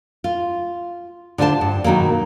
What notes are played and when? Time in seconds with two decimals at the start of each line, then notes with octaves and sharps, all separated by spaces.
0.24 F4
1.38 D3 D4 F4 C5 A5
1.61 G2
1.84 B2 D#3 F#3 A#3